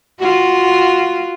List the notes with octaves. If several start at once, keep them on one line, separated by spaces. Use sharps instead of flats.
F4 F#4